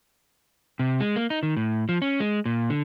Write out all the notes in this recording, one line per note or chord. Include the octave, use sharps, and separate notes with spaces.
C3
G#3
A#3
D#4
D#3
A2
F3
C#4
G#3
A#2
D3